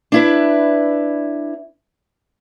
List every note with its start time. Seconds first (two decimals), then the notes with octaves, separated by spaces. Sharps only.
0.12 D4 E4 B4